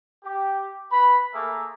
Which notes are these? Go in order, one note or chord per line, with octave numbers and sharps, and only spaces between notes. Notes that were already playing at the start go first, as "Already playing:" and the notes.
G4
B4 B5
A3 A#3 G#4 A#4 E5